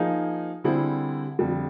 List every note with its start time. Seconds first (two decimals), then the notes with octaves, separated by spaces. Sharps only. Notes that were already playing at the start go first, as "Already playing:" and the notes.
Already playing: F3 A#3 D#4 G#4
0.64 D3 G3 C4 E4 G#4
1.39 F2 D3 G3